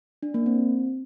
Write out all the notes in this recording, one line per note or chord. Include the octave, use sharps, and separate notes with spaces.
D4
A#3
C4